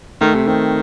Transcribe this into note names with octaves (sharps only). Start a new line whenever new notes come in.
D#3 A3
C3
D#3 C4